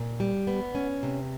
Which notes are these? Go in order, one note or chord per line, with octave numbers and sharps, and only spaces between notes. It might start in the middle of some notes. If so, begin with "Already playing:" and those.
Already playing: A#2
G3
B3
C#4
C3